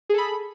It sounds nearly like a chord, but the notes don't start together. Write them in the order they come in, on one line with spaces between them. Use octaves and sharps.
G#4 A4 B5